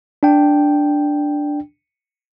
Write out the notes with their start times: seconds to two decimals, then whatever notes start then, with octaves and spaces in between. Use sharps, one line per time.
0.23 D4 G5